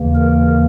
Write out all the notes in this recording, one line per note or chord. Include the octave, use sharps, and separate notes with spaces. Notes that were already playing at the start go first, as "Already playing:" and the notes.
Already playing: D#2 C#3 E3 A#3
A#4